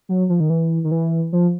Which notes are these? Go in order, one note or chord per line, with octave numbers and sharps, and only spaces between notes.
F#3
F3
D#3
E3
D#3
E3
F3